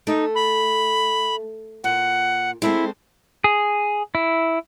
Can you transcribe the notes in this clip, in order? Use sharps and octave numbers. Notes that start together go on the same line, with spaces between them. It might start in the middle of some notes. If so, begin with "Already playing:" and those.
A3 D#4
B5
A#2 F#5
G#3 A3 C4 E4
G#4
E4